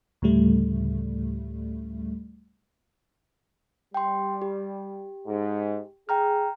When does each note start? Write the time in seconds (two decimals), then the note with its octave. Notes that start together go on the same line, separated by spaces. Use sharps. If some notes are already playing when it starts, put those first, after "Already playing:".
0.22 D2 A2 C#3 G3 A3
3.94 G3 G5 C6
4.42 G4
5.27 G#2
6.09 G#4 G5 A#5 F6